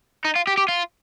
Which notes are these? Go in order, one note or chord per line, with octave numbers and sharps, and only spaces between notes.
D#4
F4
G4
G4
F4